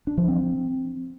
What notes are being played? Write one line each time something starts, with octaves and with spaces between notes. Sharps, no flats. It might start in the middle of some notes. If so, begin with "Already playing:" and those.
D4
F3
C4